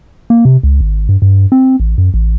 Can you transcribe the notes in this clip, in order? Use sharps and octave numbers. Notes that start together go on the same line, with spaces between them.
A#3
C3
C#2
G#1
G2
G2
C4
A1
F#2
A1